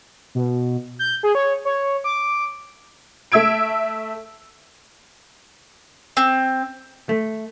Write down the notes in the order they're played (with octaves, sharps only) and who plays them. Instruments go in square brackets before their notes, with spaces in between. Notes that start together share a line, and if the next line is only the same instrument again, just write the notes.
[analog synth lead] B2
G6
G#4
C#5
C#5
D6
[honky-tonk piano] A3 E5 E6 G#6 D7
[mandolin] C4
[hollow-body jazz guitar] A3